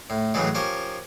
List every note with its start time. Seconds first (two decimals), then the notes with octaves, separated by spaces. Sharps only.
0.10 A2
0.34 A2 C#3 E3 F#3 G#3
0.55 F3 C#4 G4 A#4 A#5